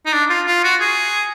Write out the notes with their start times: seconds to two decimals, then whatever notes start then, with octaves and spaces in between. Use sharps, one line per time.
0.06 D#4
0.13 D4
0.30 F4
0.47 F4
0.64 F#4
0.81 G#4